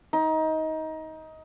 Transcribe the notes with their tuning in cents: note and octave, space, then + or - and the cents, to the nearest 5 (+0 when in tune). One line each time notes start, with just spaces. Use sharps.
D#4 +20